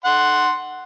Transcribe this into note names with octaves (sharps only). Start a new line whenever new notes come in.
F#5 C6